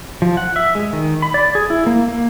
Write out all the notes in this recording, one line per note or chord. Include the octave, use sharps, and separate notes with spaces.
F3
F#5
E5
G#3
D#3
B5
D5
G#4
E4
A#3
A#3